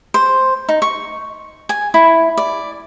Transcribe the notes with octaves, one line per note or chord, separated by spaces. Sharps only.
C5
D#4
C#6
G#5
E4
D5